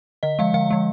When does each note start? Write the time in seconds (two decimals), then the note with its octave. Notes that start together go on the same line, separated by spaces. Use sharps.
0.23 D3 D#5
0.39 F3 G#3 F5
0.54 D3 F5
0.70 F3 G#3